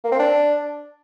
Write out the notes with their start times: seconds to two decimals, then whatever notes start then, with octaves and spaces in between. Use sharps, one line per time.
0.04 A#3
0.12 C4
0.19 D4